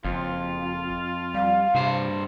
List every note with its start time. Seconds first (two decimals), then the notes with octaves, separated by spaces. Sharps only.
0.05 F#1 F2 F4
1.34 G3 F5
1.75 G2 C3 C5